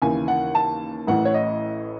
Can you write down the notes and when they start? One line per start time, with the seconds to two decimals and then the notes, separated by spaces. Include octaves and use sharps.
0.02 D#2 C#3 E3 G#5
0.28 F#5
0.55 A5
1.07 A1 A2 E3 F#5
1.25 C#5
1.34 D#5